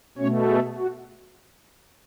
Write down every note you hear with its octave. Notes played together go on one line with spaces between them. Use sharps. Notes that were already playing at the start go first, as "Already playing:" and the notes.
B2 A3 C#4 C#5
G#4
F#4